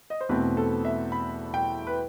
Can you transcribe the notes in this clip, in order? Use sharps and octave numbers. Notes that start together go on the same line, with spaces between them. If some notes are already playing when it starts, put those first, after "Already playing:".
D#5
C5
E2 B2 A3 C4 B4
A4
E5
B5
G5
B4